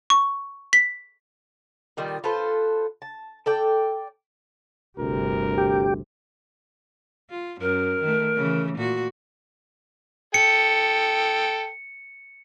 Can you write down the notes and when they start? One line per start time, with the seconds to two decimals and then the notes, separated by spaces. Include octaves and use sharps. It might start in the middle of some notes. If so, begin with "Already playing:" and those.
0.10 C#6
0.73 B6
1.97 A#2 D#3 G3 F4
2.24 F4 A4 B4 C5
3.02 A5
3.46 A4 D5 G5
4.99 G1 D2 C3 A#4
5.58 G4
7.30 F4
7.61 F#2 A#4
8.02 D#3 A3
8.36 C#3 E3
8.78 A#2 F#4
10.34 A4 G5 C#7